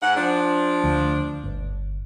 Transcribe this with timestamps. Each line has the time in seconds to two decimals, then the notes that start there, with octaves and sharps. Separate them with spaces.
0.02 G#2 F#5
0.16 F3 D4
0.84 D2
1.44 G1